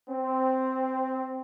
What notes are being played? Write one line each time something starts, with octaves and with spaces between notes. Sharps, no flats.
C4